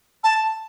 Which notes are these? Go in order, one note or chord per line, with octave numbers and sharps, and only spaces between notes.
A5